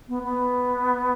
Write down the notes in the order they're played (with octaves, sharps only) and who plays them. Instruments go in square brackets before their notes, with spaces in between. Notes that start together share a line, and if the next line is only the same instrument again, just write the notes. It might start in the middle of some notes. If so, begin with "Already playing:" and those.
[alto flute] B3
B3